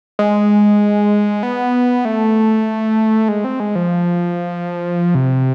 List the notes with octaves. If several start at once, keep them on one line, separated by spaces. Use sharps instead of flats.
G#3
B3
A3
G#3
C4
G#3
F3
C3